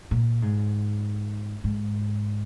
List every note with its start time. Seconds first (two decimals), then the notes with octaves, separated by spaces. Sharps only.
0.11 A#2
0.42 G#2
1.64 G#2